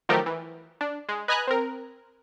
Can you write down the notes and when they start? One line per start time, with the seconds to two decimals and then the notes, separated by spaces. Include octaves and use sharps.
0.09 D#3 F3 F#3 A3 G4 A#4
0.26 E3
0.81 D4
1.09 G#3
1.28 B4 D#5 G#5 A#5 F#6
1.47 C4 A#4